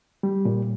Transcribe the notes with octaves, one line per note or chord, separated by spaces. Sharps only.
G3
A#2